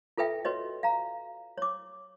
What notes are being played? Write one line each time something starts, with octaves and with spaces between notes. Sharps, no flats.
F4 A4 B4 E5 G5
F#4 B4 C#5 D#5
F5 A#5
C#5 D6